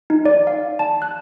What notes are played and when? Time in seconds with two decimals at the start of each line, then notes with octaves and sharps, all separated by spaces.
0.10 D#4
0.25 D5
0.47 F5
0.79 A5
1.02 F#6